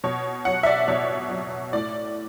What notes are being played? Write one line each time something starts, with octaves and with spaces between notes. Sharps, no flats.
B2 C#5
F#3 F#5
E5
D5
B2 C#5
F#3
A2 D5